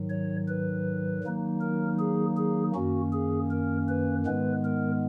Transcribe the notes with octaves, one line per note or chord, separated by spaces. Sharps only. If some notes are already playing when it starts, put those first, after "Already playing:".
Already playing: G#2 D#3 F#3
C#5
B4
D#3 F#3 A#3 D#4
A#4
G#4
G#4
F#2 D#3 A#3 C#4 F#4
G#4
A#4
B4
G#2 D#3 G#3 B3 B4
A#4